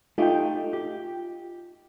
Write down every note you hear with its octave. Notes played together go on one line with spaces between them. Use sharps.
A3 D#4 F4 G4 G5
G4